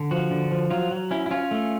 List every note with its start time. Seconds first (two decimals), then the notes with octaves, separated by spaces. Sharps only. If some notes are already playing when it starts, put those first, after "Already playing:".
Already playing: D3
0.11 F3 F#4
0.31 D3
0.51 F3
0.71 F#3 F4
0.91 F#3
1.11 C#4 E4
1.26 E4
1.31 C#4 F4
1.51 A3